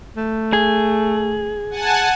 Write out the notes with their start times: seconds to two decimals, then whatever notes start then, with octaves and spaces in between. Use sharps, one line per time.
0.16 A3
0.53 G#4
1.70 F#5 G#5 A5